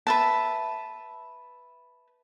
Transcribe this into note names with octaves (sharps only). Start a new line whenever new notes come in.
B4 E5 A5